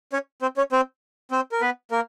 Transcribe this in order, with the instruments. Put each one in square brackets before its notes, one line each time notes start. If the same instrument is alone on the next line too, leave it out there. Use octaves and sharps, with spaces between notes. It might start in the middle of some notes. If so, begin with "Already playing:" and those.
[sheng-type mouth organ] C#4 C#5
C4 C5
C#4 C#5
C4 C5
C4 C5
A#4
B3 B4
A#3 A#4